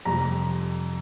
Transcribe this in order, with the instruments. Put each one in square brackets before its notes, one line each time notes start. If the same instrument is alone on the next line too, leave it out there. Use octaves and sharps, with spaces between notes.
[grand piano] F2 C3 G3 A#5